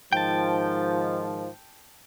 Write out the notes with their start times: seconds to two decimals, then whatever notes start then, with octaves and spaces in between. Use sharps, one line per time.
0.13 G#2 D#3 F3 G5 A5